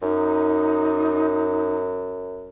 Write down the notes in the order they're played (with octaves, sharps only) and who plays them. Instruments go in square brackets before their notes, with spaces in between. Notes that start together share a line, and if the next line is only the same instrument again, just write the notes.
[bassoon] F#2 [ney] D#4